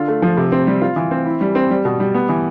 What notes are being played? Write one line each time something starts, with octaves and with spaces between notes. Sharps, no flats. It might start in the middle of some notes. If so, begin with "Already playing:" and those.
Already playing: D3 F4
A3
F3
C3
C4
G3
F4
E3
C4
E4
G3
C4
G3
B2
G3
B3
E3